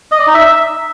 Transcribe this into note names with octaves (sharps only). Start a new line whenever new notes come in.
D#5
D5
D#4
E5